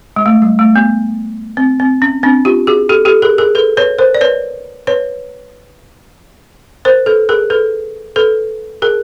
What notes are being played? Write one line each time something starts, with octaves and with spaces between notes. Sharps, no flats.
G#3
A3
G3
A3
B3
C4
C4
C#4
C4 D4
F4 G4
F#4 G#4
G4 A4
G4 A4
G#4 A#4
G#4 A#4
A4 B4
B4 C#5
A#4 C5
D5
B4 C#5
B4 C#5
A#4 C5
A4 B4
G#4 A#4
A4 B4
A4 B4
G#4 A#4